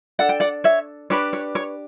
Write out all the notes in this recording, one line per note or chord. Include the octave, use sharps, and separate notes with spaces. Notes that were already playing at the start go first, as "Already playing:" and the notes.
D4 A4 F#5
G5
D5 F#5
C#5 E5
D4 G4 B4 C#5
C#5
C#5